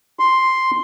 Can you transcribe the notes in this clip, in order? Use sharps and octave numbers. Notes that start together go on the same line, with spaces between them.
C6